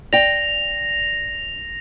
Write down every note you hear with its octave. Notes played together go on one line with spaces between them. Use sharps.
D5 G5 A#6 F7